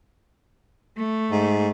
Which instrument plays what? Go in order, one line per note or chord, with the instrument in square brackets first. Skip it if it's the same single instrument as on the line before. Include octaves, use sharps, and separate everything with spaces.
[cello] A3
[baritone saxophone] G#2